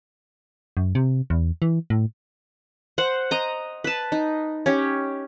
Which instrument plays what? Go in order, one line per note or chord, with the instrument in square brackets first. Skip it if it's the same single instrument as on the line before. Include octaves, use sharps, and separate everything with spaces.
[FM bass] F#2
C3
E2
E3
A2
[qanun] C5 F#5
D#5 A#5
B4 A5
D#4
C#4 G4